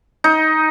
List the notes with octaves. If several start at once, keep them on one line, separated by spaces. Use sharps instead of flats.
D#4